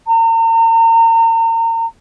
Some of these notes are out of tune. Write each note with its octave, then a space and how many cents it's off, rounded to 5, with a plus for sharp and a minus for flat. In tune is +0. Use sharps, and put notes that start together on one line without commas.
A#5 -40